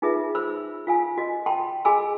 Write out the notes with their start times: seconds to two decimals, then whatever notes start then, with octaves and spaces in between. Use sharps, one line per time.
0.02 D#4 F4 G#4 B4 E5
0.35 C5 B5 E6
0.87 F4 F5 G#5
1.18 F#4 D#5
1.46 G5 A5 B5 C6
1.85 F#4 G#4 D#5 G#5 B5 E6